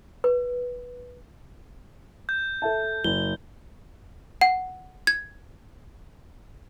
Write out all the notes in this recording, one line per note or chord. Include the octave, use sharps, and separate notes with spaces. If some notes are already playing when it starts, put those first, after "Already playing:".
B4
G6
A4 E5 A5
F#1 G7
F#5
G#6